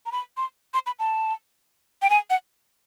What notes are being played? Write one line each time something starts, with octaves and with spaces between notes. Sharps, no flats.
A#5
B5
C6
C6
B5
A5
G5
G#5
F#5